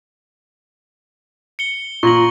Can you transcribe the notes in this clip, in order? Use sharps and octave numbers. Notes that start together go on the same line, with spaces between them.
C#7 G7
A#2 C#6 A#6 F#7